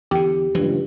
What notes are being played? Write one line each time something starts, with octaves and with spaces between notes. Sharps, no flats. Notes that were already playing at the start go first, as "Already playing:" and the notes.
E2 D3 G4
F#1 C#2 G2 E3 F3